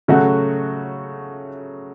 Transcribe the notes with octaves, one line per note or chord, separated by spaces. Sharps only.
C#3 F#3 A3 F#4